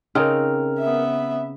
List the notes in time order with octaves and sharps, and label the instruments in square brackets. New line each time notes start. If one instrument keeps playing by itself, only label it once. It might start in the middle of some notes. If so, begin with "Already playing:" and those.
[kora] C#3 C4 D#4 [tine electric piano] A#4 F6
[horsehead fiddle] B3 E5